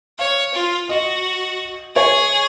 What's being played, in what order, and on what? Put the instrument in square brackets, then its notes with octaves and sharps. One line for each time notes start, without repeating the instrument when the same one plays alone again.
[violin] C#5 [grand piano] F5
[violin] F4
[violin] F#4 [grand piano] D#5
[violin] G#4 [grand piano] C#5